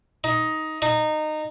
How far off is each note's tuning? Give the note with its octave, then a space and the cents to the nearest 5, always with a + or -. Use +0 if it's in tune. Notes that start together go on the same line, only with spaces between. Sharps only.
D#4 +10
D#4 -20